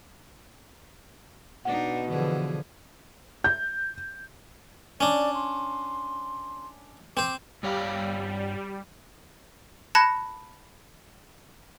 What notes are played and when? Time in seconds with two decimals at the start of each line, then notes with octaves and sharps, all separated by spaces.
1.65 B2 D4 D#4 F#5
2.09 D3 E3 F3 G#4
3.44 G6
5.01 C#4 D4 D5
5.34 C6
7.17 C4 C5 D6
7.63 G2 G3 C#5 F5
9.95 A5 B5 F#6 G#6 A#6 C#7